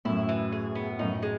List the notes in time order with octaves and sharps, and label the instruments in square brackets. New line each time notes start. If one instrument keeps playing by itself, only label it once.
[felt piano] F#2 A2 [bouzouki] E4
[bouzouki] E3
G#4
B3
[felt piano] F#2 A2 [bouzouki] D#4
[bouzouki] G#3